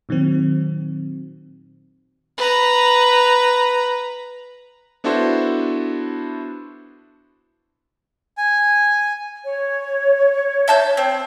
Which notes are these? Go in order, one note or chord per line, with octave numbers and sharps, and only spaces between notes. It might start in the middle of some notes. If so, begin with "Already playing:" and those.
A#2 D#3 F#3 C4
B4 A#5
B3 D4 E4 F#4 A4 C5
G#5
C#5
E5 A5 G6
C4